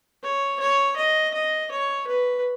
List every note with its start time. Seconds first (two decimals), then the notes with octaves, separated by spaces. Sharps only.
0.23 C#5
0.60 C#5
0.97 D#5
1.34 D#5
1.71 C#5
2.07 B4